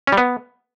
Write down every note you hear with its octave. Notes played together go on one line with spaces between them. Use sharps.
C#4
G3
B3